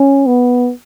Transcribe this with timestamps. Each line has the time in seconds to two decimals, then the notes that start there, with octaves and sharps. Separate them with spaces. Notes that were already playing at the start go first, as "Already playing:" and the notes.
Already playing: C#4
0.26 B3